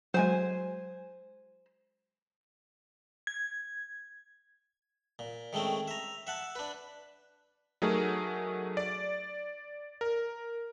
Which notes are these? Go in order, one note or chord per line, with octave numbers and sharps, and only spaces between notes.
F#3 G#3 C5 G#5
G#6
A#2
D#3 G#3 A3 C4 C#4
E5 A#5
E5 F#5 A5
D4 B4
F#3 A3 D#4 G#4 A#4
D5
A#4